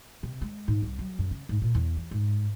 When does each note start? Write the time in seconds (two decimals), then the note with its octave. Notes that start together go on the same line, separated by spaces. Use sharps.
0.23 C3
0.41 G#3
0.68 G#2
0.82 C2
0.99 F#3
1.19 F#2
1.31 C#3
1.49 G#2
1.62 A#2
1.75 E2
1.97 E3
2.11 G#2